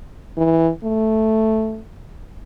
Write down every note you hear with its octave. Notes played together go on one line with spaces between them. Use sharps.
E3
A3